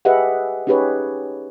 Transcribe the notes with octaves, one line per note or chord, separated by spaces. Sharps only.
G4 G#4 B4 D#5 E5 F#5
C#4 D#4 G4 G#4 B4 C#5